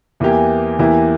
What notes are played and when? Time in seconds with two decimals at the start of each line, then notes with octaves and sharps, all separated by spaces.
0.20 E2 E3 A#3 E4 G4
0.79 E2 E3 A#3 E4 G4